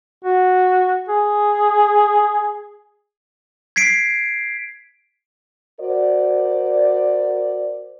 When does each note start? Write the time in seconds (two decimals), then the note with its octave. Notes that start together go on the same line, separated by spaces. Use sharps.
0.24 F#4
1.09 G#4
3.76 G#6 B6 C7 D7
5.80 F#4 A#4 C5 D5